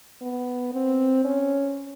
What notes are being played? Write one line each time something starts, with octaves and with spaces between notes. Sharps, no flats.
B3
C4
C#4